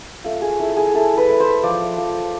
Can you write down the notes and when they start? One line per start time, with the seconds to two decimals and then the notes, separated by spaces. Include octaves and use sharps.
0.24 A3 F4
0.42 G#4
0.60 E4 A4
0.77 G#4
0.94 E4 A4
1.17 B4
1.29 A3
1.40 C5
1.63 F3 D5
1.98 F3